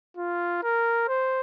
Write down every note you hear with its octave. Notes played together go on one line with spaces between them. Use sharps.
F4
A#4
C5